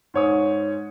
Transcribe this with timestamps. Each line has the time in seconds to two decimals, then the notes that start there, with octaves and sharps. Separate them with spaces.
0.14 G#2 C#5 D#6